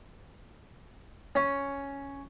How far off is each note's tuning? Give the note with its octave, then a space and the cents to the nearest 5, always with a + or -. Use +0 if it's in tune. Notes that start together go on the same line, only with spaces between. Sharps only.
C#4 +5